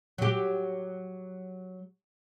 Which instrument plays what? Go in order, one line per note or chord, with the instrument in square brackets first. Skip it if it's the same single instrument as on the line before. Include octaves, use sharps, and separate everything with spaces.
[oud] F#3 G4